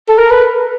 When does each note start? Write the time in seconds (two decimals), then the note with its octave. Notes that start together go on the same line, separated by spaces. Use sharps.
0.09 A4
0.18 A#4
0.30 B4